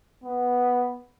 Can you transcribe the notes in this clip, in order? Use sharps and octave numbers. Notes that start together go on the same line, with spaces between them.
B3